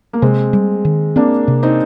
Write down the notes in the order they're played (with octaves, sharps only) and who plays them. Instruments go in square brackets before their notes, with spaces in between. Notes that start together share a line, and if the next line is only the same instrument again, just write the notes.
[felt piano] A#3
[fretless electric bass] C3 [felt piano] G#3 C4
[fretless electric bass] G3
D#3
[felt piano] A#3 D4 [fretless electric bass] C4
[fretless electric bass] C3
[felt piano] C4 D#4